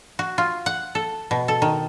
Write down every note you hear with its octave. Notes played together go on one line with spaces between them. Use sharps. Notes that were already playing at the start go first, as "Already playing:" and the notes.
F#4
F4
F#5
A4
B2
A4
D#3